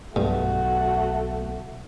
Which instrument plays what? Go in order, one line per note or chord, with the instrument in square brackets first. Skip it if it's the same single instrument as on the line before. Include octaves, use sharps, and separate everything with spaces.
[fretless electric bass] B1 [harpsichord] G2 [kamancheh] A3 F#4